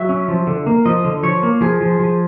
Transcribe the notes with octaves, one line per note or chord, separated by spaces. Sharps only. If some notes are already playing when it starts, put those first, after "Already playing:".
Already playing: F#3 E5
C#4
F3
D3
A#3
F3 D#5
D3
F3 C#5
A#3
F3 G#4
F3
F3